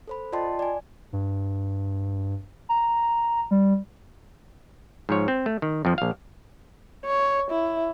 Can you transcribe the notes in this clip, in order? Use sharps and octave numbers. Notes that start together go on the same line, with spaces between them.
A4 C5 B5
F4 D5 D#5 G5 A5 C6
D5 G#5
G2
A#5
G3
G#2 F3 C#5
C4
A3
D#3
F2 F3
A#1 F5
C#5
E4